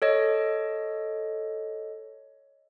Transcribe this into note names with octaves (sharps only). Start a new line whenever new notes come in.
A4 C#5 D#5